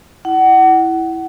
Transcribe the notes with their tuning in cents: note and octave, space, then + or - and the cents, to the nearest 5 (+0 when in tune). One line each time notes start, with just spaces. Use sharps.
E4 +0 F#5 +25